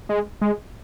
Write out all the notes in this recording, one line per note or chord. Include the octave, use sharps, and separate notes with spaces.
G#3
G#3